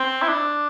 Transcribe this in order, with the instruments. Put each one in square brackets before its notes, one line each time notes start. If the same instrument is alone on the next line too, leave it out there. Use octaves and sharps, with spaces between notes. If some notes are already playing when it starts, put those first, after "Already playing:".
Already playing: [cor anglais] C4
E4
D4